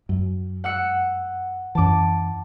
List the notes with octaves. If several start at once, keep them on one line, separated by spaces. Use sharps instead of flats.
F#2
F#5 E6 C#7
F#2 E3 A5 D6